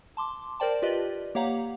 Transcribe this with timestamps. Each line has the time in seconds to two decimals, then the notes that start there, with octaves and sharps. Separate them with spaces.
0.17 A5 C6 D6
0.60 A#4 C5 D5 G5 A5
0.82 F4 G4 B4 D5 D#5
1.35 A#3 G4 C#5 F5 F#5 A#5